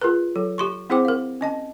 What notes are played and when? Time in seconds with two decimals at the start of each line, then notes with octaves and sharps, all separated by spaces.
0.01 F4 G#4 A#4 B4
0.36 F#3 A4
0.58 G4 C6 C#6
0.90 C4 E4 G#4 C5 G5 D6
1.05 A#4 F5
1.41 C#4 D#5 A5